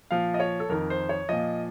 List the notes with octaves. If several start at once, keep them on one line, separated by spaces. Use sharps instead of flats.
A#2 F3 F5
D#5
C#5
A4
F2 D#3 A#4
C5
C#5
A#2 F3 D#5